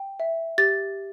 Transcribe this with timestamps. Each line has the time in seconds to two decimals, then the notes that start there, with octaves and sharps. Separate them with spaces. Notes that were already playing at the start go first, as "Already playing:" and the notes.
Already playing: G5
0.20 E5
0.58 G4 A6